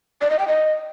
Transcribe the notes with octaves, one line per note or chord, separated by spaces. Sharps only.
D5
D#5
G5
D#5